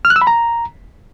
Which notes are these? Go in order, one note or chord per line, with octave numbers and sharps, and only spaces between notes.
F6
F#6
E6
B5
A#5